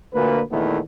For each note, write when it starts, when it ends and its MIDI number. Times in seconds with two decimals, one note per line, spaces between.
0.14 0.41 38
0.14 0.41 46
0.14 0.41 71
0.51 0.79 40
0.51 0.79 46
0.51 0.79 51
0.51 0.79 52
0.51 0.79 57
0.51 0.79 59